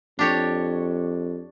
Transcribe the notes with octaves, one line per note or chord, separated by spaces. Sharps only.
F2 D4 G4 C#5